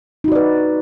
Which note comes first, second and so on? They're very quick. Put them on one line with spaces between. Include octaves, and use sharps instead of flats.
D#4 F#4 D5 B4